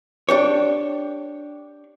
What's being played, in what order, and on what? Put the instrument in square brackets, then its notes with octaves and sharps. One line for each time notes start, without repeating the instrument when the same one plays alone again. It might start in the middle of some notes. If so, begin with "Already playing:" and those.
[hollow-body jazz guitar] D4 G4 C#5